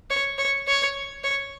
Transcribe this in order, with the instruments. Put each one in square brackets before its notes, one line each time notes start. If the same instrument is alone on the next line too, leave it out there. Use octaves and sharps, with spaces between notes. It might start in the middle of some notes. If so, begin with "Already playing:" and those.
[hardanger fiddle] C#5
C#5
C#5
C#5